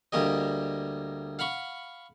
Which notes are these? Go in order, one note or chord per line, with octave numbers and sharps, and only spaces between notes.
D2 G3 A#3 G4 D#5
F5 F#5 B5 C#6